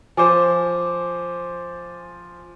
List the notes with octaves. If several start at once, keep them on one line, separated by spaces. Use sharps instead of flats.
F3 C5 G#5 D6